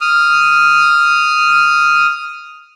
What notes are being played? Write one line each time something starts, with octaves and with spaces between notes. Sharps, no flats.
D#6 F6